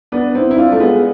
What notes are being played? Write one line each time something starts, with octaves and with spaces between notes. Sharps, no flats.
B3 D4
C4 E4
E4
D4 F4
A3
G#3 B3